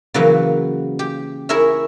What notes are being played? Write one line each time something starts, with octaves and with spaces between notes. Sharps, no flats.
C#3 E3 F#3 A#3 B4
G4
E4 G#4 A#4 C#5 E5